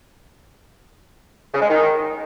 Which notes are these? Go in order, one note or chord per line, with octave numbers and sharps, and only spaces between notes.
C#3
G#3
D#3